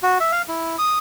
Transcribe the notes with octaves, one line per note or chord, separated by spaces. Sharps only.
F#4
E5
F5
E4
D#6